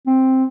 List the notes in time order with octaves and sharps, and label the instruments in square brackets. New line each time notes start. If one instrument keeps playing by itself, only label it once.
[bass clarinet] C4